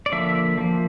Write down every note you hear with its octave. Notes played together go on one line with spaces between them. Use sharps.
D5
D3 F3 A#3 E5
F3 A#3